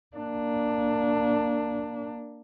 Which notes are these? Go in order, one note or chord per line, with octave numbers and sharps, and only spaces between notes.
A#3 D4